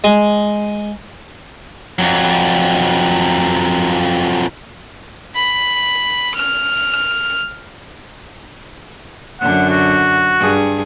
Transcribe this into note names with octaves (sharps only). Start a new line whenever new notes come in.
G#3
F2 F#3
B5
F6
F#2 D3 F#5
F#4
G2 G#4